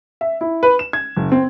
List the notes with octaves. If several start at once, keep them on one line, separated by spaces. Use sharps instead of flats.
E5
E4
B4
E7
G#6
F#1
C4